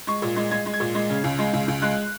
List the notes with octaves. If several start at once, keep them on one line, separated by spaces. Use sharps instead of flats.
G#3 C#6
A#2
G#3
G#3 G#6
G#3
G#6
A#2
G#3
C#3
C#2
G#3
C#2
C#2
G#3 F#6